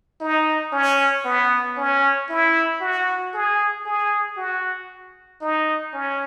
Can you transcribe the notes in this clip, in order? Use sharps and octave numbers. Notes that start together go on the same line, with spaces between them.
D#4
C#4
B3
C#4
E4
F#4
G#4
G#4
F#4
D#4
C#4